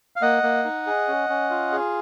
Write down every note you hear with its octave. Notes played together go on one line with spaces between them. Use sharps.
F5
A#3 D#5 F#5
A#3
D#4
G#4
C#4
C#4
F4
G#4